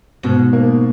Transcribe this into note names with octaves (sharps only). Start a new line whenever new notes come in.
G#2 B2
A#3